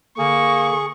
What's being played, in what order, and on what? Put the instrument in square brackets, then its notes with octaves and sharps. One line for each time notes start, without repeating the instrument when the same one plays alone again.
[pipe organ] D3 [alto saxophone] A#3 [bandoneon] G#4 [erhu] C#6